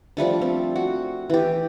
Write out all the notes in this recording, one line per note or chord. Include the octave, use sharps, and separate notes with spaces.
F3 G3 A3 D4
C4
F#4
E3 G4